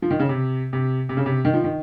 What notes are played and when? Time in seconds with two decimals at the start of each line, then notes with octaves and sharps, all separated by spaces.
0.02 F3
0.11 D#3
0.20 C#3
0.29 C3
0.73 C3
1.09 C3
1.17 C#3
1.26 C3
1.45 D#3
1.54 F3
1.64 D#3